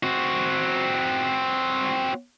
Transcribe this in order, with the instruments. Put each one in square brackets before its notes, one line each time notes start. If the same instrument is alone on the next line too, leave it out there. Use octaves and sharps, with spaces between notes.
[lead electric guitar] C4 F#4